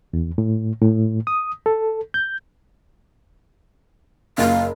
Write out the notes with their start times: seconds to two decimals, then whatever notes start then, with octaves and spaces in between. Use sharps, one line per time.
0.13 E2
0.38 A2
0.82 A2
1.27 D#6
1.66 A4
2.14 G6
4.38 F#1 F5